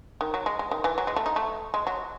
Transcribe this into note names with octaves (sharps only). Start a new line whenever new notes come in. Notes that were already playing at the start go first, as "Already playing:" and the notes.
D#3
F#3
G#3
G#3
D#3
E3
F#3
G#3
A3
D#4
A3
G#3
F#3